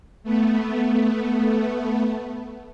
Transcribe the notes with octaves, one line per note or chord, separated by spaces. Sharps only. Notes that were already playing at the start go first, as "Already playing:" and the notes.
A3 B3